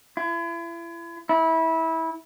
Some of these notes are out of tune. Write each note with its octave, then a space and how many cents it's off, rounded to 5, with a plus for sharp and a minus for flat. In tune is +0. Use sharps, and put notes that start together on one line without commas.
E4 +40
E4 -20